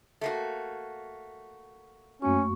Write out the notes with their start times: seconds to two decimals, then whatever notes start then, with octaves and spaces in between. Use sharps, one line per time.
0.21 A3 A#3 F#4
2.22 F#2 A3 A#3 C#4 F#4 C#6